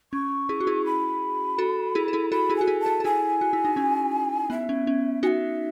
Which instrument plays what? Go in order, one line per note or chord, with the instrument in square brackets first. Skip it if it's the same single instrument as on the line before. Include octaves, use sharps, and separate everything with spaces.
[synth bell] C#4 [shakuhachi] C#6
[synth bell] E4 G#4
F#4
E4 G#4
[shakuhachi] B5
[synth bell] F#4 A4
E4 G#4
A4
E4 G#4
[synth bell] F#4 A4 [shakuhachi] B5
[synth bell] E4 G#4
[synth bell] F#4 [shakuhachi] G#5
[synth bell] E4 G#4
[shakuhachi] A5
[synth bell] F#4 A4
A4
[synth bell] E4 G#4 [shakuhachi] G#5
[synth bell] F#4
E4
D#4
C#4 E4
[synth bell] B3 [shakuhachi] E5
[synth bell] C#4
C#4
[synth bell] D#4 F#4 [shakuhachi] G#5
[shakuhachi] E5